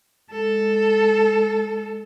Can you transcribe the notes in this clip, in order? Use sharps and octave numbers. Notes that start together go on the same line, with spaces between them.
G#3 A4